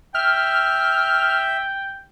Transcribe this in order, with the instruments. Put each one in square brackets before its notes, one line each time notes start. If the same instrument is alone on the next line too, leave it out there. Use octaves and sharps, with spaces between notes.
[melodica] E5 [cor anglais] G5 [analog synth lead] F6